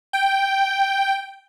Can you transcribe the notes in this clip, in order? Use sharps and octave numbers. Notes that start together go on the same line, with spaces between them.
G5